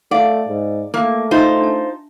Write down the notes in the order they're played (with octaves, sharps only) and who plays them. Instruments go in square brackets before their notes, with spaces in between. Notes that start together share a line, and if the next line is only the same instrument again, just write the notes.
[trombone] A3 [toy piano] F4 F5 F#5 [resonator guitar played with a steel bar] D5
[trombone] G#2
[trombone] A3 [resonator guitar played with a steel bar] A#3 [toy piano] F4 F5 E6
[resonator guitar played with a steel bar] D#4 F4 C5 [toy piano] E5 G5
[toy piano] D4 A5